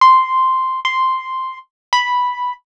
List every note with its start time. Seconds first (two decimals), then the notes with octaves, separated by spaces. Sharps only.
0.01 C6
0.85 C6
1.93 B5